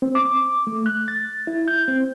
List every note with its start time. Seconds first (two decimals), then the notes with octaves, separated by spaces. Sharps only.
0.02 C4
0.15 D6
0.67 A3
0.86 F#6
1.08 A6
1.47 E4
1.68 G6
1.88 C4